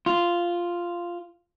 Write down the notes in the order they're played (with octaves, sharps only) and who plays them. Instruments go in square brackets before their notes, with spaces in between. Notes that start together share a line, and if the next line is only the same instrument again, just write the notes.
[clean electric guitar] F4